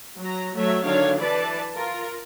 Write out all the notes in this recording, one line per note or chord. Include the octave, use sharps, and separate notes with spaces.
F#3 A#5
F#3 A3 C#5 E5
D3 D#3 F#3 D4 C#5 F5
E3 B4 D5 A5
F4 A#4